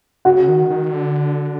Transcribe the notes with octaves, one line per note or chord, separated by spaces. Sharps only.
C#3 F#4 F#5
D#3
D#3
D3